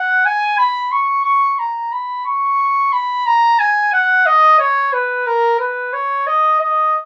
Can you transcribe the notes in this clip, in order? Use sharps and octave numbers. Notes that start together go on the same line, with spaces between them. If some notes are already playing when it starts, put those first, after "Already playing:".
Already playing: F#5
G#5
B5
C#6
C#6
A#5
B5
C#6
B5
A#5
G#5
F#5
D#5
C#5
B4
A#4
B4
C#5
D#5
D#5